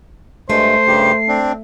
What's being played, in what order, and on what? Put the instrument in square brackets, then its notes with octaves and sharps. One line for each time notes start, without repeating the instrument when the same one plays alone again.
[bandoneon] G2 G#3 [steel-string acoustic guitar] A3 [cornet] C5 [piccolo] C7
[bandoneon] G2 C#3 G4
C4 D4